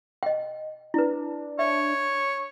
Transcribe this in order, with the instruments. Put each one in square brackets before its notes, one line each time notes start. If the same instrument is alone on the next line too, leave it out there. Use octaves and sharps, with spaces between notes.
[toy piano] D#5 G5
[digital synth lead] D4 [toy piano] E4 B4
[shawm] C#5 [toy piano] E5